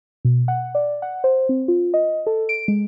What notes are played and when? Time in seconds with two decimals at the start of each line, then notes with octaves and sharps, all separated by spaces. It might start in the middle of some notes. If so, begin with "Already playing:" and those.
0.25 B2
0.48 F#5
0.75 D5
1.02 F#5
1.24 C5
1.49 C4
1.68 F4
1.94 D#5
2.27 A4
2.49 D7
2.68 G#3